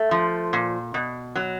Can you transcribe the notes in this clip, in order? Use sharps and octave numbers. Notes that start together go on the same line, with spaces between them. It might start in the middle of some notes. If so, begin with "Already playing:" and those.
Already playing: A3
F3
A#2
B2
F#3